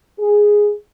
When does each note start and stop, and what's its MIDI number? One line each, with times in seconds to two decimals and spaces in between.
0.19 0.71 68